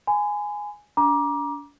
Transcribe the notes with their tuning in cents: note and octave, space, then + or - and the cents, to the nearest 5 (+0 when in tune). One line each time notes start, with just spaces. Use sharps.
G#5 +0 B5 +45
D4 -40 A#5 +30 D6 +0